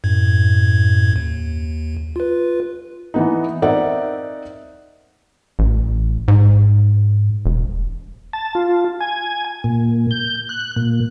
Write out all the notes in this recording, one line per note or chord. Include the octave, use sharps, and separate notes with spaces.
F#2 A2 G#6
D#2
F4 B4
E3 B3 D#4
C4 D#4 A#4 D5 E5 F#5
A1
G#2
E1
A5
F4
G#5
A#2
G6
F#6
A#2